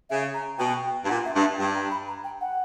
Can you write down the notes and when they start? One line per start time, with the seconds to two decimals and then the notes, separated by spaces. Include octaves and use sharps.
0.10 C#3 E5
0.34 A#5
0.58 B2 G5
1.03 G2
1.09 A#2 F#5
1.25 E5
1.34 G2
1.41 E5
1.58 G2 G5
1.74 A#5
1.91 B5
2.08 A#5
2.24 G5
2.41 F#5